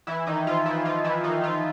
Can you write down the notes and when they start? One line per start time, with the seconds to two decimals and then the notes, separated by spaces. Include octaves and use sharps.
0.07 E3 E4
0.27 D#3 D#4
0.47 F3 F4
0.66 E3 E4
0.85 F3 F4
1.04 E3 E4
1.24 D#3 D#4
1.43 F3 F4